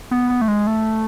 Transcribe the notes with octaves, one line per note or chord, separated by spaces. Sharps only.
B3
B3
A3
G#3
A3